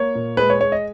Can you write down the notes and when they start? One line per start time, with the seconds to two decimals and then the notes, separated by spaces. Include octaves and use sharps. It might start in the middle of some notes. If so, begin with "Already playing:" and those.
Already playing: A#3 C#5
0.15 A#2
0.37 G#3 B4
0.50 C#5
0.61 G#3 C#5
0.72 D#5